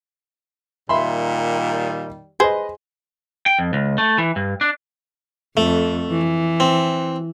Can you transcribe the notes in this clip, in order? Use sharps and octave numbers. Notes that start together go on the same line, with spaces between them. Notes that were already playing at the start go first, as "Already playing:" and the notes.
A#2 D#3 G3 E5 B5 C6
G#4 B4 C5 D#5
G5
F2
C#2
A3
E3
G2
D4
F2 A3
E3
C4